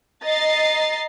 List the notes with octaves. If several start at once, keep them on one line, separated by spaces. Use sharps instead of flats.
D#5 A#5 A6 C7